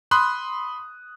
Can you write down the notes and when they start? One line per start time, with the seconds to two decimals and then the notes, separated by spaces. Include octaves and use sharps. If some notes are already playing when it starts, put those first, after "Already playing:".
0.11 B5 C6 D#6 F#6